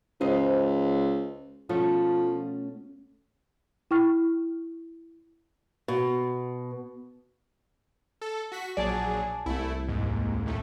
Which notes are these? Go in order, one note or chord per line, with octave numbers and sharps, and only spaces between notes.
C#2 C5 D#5
B2 F3 A3 C#4
E4 G5 C#6 F6
B2
A4
F#4 B6
A#1 F#3 G#4 D5 G#5 A5
C2 A3 E4
D#2 G#2
D#2 A2 A3